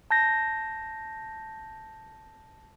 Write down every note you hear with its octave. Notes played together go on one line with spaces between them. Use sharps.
A5 G6 A#6